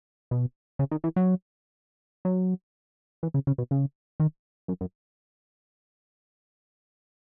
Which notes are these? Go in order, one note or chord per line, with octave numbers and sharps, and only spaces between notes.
B2
C#3
D#3
E3
F#3
F#3
E3
C#3
C#3
B2
C#3
D#3
F#2
F#2